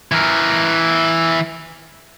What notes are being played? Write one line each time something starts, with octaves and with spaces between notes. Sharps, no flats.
E3 A#4